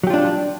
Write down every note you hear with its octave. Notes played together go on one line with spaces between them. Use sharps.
F#3 D4 F4 G4